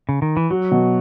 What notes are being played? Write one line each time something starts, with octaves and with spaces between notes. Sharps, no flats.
C#3
D#3
E3
F#3 F#4
B2